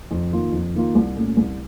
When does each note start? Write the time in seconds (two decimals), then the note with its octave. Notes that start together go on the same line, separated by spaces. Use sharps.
0.11 F2
0.31 D#3 A#3 F4
0.52 F2
0.74 D#3 A#3 F4
0.95 C2
1.15 A#2 A3 C#4
1.37 C2